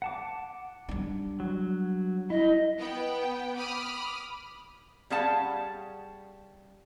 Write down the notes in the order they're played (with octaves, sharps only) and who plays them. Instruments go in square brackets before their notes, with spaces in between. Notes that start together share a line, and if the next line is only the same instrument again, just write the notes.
[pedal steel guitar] F#5 A5 D6
[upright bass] G3 D4
[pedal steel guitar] F#3
[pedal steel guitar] E4 [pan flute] D#5
[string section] B3 G5
B5 D6 D#6 F6
[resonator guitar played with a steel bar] G3 C#4 G#4 F5 F#5 A5